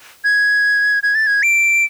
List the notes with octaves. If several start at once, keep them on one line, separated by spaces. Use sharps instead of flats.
G#6
G#6
A6
G#6
D7